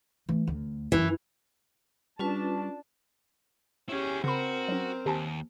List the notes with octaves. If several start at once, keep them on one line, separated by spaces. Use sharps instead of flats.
E3 A3
D2
F#2 E3 F4
G3 C#4 D4 F4 B4 A5
C#4 E4 G4 G#4
C#3 C4 F#4 A#4 B5
F#3 C#4
D#2 G4 G#5 A5